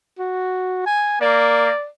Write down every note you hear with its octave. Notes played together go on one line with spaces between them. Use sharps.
F#4
G#5
A#3 D5